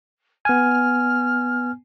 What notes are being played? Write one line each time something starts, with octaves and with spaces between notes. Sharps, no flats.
B3 G#5 F6